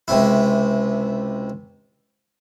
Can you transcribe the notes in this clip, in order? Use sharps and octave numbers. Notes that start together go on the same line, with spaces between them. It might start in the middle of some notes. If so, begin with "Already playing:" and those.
C#2 C3 E4